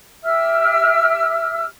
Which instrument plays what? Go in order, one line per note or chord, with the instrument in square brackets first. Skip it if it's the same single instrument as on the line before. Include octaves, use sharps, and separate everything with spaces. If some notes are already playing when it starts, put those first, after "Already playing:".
[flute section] G4 E5 E6 F6